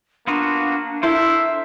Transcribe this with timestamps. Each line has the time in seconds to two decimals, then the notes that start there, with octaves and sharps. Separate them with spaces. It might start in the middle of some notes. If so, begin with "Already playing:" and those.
0.27 A#3 B3 D4 F4 F#4
1.03 E4 A4 A#4 C5 E5